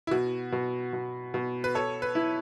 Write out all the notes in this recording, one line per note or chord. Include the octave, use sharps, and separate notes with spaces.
E4
B2 F#4
B2
B2
B2
B4
A4 C#5
B4
E4